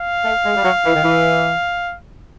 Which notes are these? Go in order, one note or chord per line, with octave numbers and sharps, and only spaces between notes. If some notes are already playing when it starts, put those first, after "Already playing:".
Already playing: F5
A3
G#3
G3
F#3
E3
D#3
E3